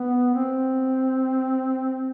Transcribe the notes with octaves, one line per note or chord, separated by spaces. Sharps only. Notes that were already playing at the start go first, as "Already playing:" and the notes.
Already playing: B3
C4